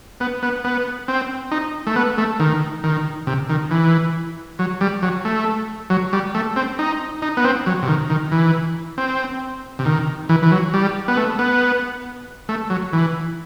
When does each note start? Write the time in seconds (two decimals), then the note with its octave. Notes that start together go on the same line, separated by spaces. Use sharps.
0.20 B3
0.43 B3
0.64 B3
1.08 C4
1.51 D#4
1.87 A3
1.96 B3
2.18 A3
2.40 D#3
2.84 D#3
3.27 C3
3.49 D#3
3.71 E3
4.59 F#3
4.81 G3
5.02 F#3
5.25 A3
5.90 F#3
6.13 G3
6.35 A3
6.56 C4
6.79 D#4
7.22 D#4
7.37 B3
7.44 C4
7.66 F#3
7.83 C3
7.88 D#3
8.10 D#3
8.32 E3
8.98 C4
9.79 C3
9.85 D#3
10.29 E3
10.42 E3
10.51 F#3
10.74 G3
11.08 B3
11.17 A3
11.39 B3
12.49 A3
12.70 F#3
12.93 E3